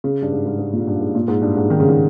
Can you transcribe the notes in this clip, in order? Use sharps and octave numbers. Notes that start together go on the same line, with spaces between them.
C#3
G2
G#2
G#2
G#2
A#2
G2
G#2
A#2
G#2
G2
G#2
D#3
C#3
D#3